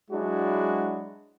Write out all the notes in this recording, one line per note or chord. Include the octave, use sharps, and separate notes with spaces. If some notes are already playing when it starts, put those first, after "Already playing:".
F#3 G#3 D4 E4 F#4